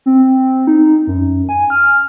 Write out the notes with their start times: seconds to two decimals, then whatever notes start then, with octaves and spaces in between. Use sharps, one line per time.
0.06 C4
0.67 D#4
1.07 F#2
1.49 G#5
1.70 F6